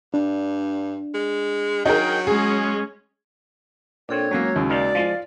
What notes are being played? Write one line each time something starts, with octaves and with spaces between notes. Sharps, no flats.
G2 D4
G#3
F#3 D#4 G#4 A#4 G5
G#3 C#4 G#4
A#2 C4 D4 A4 C#5 G5
F#3 G#3 A#3 C#4 F#4 E6
D#2 C#3
D#3 D#4 D5 F5
F3 G#3 F4 F5